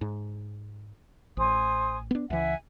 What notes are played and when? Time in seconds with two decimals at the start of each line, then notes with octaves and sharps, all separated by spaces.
0.01 G#2
1.37 A1 C5 G#5 D#6
2.11 B3 D4
2.30 C#2 E3 E5 F#5 G#5